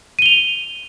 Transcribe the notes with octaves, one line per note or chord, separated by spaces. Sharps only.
D#7 F7 G7